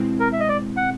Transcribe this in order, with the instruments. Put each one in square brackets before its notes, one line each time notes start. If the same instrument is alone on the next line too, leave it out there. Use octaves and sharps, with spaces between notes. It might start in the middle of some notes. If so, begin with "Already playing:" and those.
Already playing: [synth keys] B2 G#3 C4 E4
[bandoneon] A#4
E5
D#5
D5
F#5